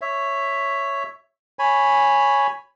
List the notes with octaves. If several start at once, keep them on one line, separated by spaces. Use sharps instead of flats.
C#5 E5
C#5 G#5 B5